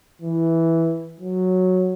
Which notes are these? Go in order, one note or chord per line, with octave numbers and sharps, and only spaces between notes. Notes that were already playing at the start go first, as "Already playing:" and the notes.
E3
F#3